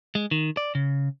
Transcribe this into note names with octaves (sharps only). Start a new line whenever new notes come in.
G#3
D#3
D5
C#3